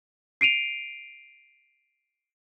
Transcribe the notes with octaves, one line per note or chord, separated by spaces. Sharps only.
C7 D7 D#7 F7